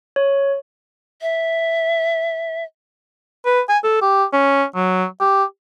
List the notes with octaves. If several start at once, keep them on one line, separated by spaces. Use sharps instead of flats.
C#5
E5
B4
G#5
A4
G4
C#4
F#3
G4